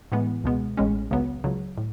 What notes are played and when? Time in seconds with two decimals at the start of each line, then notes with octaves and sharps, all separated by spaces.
0.12 A2 E3 G#3 B3
0.44 C#2 B2 G#3 B3
0.77 A1 A2 G#3 C#4
1.11 C#2 C#3 F#3 B3
1.44 C#2 C#3 F#3
1.78 A2